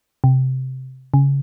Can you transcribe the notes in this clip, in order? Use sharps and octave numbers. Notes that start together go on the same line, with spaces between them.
C3
C#3